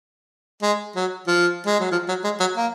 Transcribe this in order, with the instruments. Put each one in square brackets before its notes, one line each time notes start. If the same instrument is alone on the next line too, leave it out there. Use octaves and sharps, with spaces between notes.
[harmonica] G#3
F#3
F3
G#3
F#3
F3
F#3
G#3
F#3
A#3